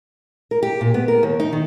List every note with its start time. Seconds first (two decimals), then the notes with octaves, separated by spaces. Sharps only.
0.51 A#4
0.63 G4
0.81 A#2
0.94 B3
1.08 A#4
1.23 D#2
1.40 D#4
1.53 D#3